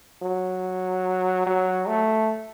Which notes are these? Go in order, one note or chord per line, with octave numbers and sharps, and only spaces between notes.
F#3
F#3
A3